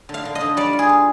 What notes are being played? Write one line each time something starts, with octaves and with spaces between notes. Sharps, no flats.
D3
F5
D3
D#5
D3
G3 D5
F4
G#4
F4